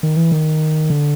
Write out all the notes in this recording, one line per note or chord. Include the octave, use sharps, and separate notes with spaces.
D#3
E3
D#3
D3